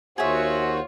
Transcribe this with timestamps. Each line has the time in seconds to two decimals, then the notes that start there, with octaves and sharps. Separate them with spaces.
0.18 D#2 F4 F#4 G#4 C5 C#5 E5 F#5